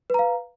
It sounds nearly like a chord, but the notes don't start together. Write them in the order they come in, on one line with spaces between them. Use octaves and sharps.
B4 A#5 F5